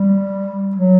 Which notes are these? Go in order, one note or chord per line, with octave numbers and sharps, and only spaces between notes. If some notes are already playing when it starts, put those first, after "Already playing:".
Already playing: G3
F#3